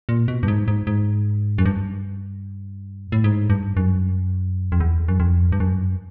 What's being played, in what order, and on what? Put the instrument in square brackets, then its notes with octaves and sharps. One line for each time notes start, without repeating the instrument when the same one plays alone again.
[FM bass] A#2
B2
G2
G#2
G#2
G#2
F#2
G2
A2
G#2
G2
F#2
F2
E2
F#2
F2
G2
F#2